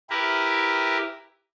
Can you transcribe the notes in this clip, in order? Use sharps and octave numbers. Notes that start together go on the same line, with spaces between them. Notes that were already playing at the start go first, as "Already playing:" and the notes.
E4 G4 A#4 B4